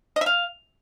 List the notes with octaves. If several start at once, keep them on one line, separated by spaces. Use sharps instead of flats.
D#5
E5
F5